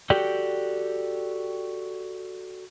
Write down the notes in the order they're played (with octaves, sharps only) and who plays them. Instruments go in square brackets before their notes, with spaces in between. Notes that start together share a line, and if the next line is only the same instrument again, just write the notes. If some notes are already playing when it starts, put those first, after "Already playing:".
[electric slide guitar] F#4 G4 A4 D5 G5